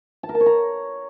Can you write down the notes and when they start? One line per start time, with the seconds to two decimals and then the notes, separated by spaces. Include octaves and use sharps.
0.23 A5
0.29 A#4
0.35 A5
0.40 C#5
0.46 A#5